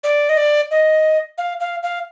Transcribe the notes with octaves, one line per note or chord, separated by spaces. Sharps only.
D5
D#5
D5
D#5
F5
F5
F5